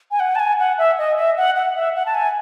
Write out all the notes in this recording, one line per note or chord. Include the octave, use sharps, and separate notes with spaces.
G#5
F#5
A5
G#5
F#5
E5
D#5
E5
F#5
F#5
E5
F#5
A5
G#5